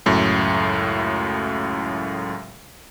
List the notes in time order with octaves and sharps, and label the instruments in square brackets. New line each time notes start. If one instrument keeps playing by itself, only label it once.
[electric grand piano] C#2 F#2 A2